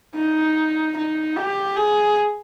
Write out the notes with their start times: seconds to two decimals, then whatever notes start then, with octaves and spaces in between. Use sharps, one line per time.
0.16 D#4
0.97 D#4
1.36 G4
1.76 G#4